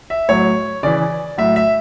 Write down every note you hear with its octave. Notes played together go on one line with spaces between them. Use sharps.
E5
A2 F#3 C#5
C#3 E3 D5
A2 F#3 E5
E5